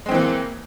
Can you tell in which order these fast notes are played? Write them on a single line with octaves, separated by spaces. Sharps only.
G#3 C4 E3 A#3